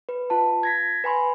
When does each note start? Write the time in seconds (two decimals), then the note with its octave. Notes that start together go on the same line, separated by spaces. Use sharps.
0.09 B4
0.30 F4 A5
0.63 G#6 A#6 B6
1.04 B4 G#5 B5 C6